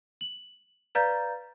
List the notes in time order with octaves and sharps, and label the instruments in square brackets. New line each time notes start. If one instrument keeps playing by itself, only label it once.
[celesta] F#7
B4 D5 F5 A#5 G6 A6